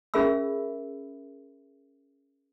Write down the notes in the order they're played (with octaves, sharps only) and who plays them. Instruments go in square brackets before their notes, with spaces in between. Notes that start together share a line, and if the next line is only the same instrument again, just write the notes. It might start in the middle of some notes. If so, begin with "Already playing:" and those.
[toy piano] C#4 G#4 A#4 E5 B5 E6